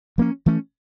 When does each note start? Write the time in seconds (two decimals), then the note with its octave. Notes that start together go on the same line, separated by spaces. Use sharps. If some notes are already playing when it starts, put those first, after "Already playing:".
0.18 F3 A#3 C#4
0.46 E3 A3 C#4